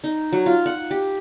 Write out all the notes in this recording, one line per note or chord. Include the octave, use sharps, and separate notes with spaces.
D#4
F#3
F4
F#5
G4